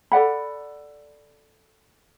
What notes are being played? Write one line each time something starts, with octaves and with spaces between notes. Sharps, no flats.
A4 D5 F#5 B5